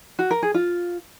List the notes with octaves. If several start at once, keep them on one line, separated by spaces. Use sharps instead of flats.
F#4
A#4
G#4
F4